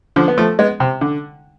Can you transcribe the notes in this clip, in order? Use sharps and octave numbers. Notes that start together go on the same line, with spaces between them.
D3 F3
B3
F3 A3
G#3 B3
C3
D3